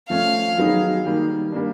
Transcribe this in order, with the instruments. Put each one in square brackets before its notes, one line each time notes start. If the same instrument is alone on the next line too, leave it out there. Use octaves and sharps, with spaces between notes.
[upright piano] F3 A3 C#4 [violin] F5
[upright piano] D#3 F#3 B3 D#4 G#4
D#3 G3 A#3
G3 A#3 D4